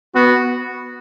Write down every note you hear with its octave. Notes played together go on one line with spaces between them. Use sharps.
B3 F#4